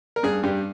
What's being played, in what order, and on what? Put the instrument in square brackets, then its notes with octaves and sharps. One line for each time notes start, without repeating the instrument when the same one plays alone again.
[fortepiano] A#4
G2 G#4
G2 G4